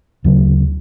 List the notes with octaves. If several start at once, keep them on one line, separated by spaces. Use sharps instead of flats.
D2 C#3 F#3